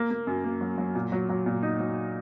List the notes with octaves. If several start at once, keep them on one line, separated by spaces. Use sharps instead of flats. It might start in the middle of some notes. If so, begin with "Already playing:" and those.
Already playing: A#3
A#3
F#2
A#3
F#3
F#3
A#2
F#3
F#3
A#2
D#4
F#3